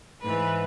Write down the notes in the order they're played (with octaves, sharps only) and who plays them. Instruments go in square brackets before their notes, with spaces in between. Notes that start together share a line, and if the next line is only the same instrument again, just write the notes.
[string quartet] G#2 E3 B4